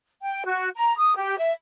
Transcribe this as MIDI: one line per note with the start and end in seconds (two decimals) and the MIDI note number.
0.23 0.43 79
0.44 0.68 66
0.75 0.95 82
0.97 1.16 87
1.17 1.36 67
1.38 1.53 76